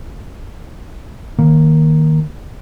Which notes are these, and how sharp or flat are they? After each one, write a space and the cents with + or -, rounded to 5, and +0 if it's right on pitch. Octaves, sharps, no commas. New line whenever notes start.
D#3 +0 A#3 +0